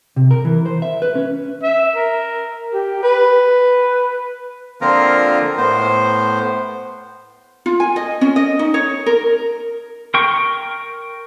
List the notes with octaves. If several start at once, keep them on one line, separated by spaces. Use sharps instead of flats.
C3
A#4
E3
C5
E5
B4
C#4
E5
A#4
G4
B4
D3 F3 A#3 C4 F4 A#4
A2 B3 C5
F4
G#5
D#5
C#4
D#5
D#4
C#5
A#4
A#4 G5 C#6